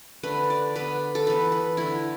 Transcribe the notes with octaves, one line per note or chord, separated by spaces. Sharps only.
D3 A3 B4
D5
D3 B3 B4
A4
E3 B3 B4
B4
D3 A3 E4